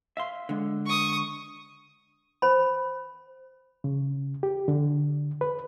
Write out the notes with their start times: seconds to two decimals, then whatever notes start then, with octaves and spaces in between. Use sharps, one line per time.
0.17 E5 F5 C6
0.49 D3 G#3
0.86 C#6 D#6
2.42 C5 B5
3.84 C#3
4.43 G4
4.68 D3
5.41 B4